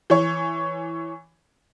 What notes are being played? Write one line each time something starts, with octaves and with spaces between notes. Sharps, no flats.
E3 C#5